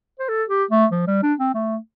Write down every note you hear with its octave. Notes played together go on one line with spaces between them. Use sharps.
C5
A4
G4
A3
F3
G3
D4
C4
A3